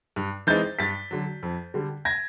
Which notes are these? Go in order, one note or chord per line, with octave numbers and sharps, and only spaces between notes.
G2
E3 G#3 C4 D#4 G6 A6
G2 A6 B6
D3 F#3
F2
D3 G3
G#6 A#6